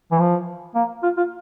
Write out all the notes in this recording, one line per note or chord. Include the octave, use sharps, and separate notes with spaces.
E3
F3
A#3
F4
F4